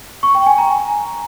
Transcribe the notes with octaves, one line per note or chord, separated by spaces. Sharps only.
C#6
G5
G#5
A#5